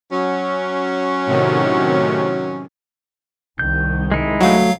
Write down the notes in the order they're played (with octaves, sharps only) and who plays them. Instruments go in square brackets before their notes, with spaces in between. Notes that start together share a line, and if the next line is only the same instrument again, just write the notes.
[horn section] F#3 C#4
[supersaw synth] A2 C3 D#3
[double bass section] C2 D#3 [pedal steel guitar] G6
[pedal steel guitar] G#3 D#4 E4
[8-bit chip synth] F#3 F5 [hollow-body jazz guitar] A3 F#4